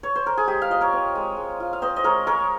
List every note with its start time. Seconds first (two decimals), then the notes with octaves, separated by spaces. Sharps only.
0.03 C#5
0.15 C5
0.26 A#4
0.37 G#4
0.47 G#3 G4
0.62 F5
0.70 F4 D#5
0.81 A#4 C#5
0.92 C4
1.15 G#3
1.37 G#3
1.60 F4
1.73 F5
1.82 C4 C5 D#5
1.96 D#5
2.04 G#3 A#4 C#5
2.26 G#3 A#4 C#5